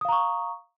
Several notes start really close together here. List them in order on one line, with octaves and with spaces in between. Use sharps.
D#6 F5 A#5 C#6